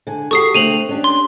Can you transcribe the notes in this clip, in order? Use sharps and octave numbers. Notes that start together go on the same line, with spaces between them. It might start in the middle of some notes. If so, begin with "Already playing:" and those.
D3 G#5
F#4 G4 A4 C#6 D#6 C7
D3 A3 C4 D#7 F7 F#7
C#4 D4 G4
C6